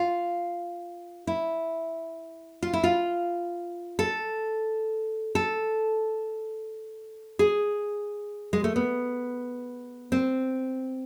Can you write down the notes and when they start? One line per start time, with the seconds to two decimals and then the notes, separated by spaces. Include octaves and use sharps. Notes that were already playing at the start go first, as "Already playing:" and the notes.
Already playing: F4
1.27 E4
2.62 F4
2.73 E4
2.84 F4
3.99 A4
5.35 A4
7.39 G#4
8.53 G#3
8.64 A3
8.76 B3
10.12 C4